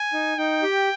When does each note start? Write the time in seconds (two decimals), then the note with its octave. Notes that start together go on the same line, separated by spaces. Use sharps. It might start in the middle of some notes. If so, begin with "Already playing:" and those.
Already playing: G#5
0.13 D#4
0.38 D#4 G5
0.62 G4